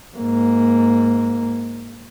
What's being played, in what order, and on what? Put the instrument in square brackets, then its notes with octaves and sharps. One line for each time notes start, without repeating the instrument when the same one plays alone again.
[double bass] G#2 A#3